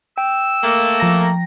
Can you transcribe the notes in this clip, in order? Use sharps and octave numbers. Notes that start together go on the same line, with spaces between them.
G5 E6
A3 A#3
F3 A#5 A#6